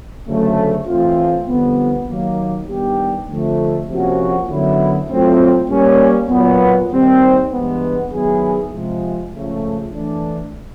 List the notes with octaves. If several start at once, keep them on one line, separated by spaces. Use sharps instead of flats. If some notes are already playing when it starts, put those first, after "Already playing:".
D2 C#3 F#3 A3
A2 E3 A3 C4 F4
F2 D3 G3 B3
D#2 D#3 F#3 A#3
D#3 G3 B3 D4 G4
F2 D3 F3 A3
C3 F3 A#3 C#4 F#4
F#2 D3 F#3 B3 E4
A2 F#3 A3 C4 F4
G3 A#3 C#4
A#2 F#3 B3
D#2 D#3 G3 C4
G2 E3 G#3 B3
D#3 F#3 B3 E4 G#4
C3 F3 G#3
C#2 C#3 F3 A3
A2 E3 A3 D4